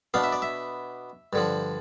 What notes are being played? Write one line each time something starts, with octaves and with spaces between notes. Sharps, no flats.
B2 B3 D4 F5
E5
D5
E5
G2 D3 F3